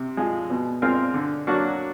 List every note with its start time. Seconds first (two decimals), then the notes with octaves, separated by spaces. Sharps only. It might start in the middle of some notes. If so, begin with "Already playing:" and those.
Already playing: C3
0.17 F3 G#3
0.50 B2
0.82 G#3 C4 F4 A#4
1.14 D3
1.47 F#3 A#3 D4 F#4